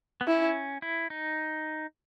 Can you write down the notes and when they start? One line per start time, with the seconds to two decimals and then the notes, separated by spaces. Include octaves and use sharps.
0.21 B3
0.27 C#4 E4
0.82 E4
1.10 D#4